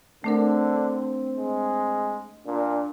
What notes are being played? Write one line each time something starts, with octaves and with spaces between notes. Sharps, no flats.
D3 A3 C4 D4 A#4
G#3
A#2 D4